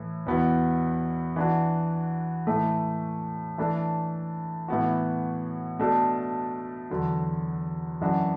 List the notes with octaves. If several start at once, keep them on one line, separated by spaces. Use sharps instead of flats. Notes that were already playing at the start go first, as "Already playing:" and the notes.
Already playing: A2 E3
E2 B2 B3 E4
E3 D4 F#4
A2 E3 A3
E3 A3 D4 A4
A2 E3 B3 F#4
B2 A3 D4 A4
E2 D3 F#3
F#2 E3 D4 F#4